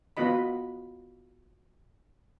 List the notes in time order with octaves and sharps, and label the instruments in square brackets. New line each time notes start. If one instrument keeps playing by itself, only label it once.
[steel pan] B3 F4 F#4 D#5 B5